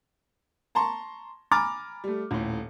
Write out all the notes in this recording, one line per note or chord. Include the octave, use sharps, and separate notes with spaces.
A5 A#5 C6 C#6
G#5 A#5 B5 D6 F6 A6
G3 A3
D#1 A2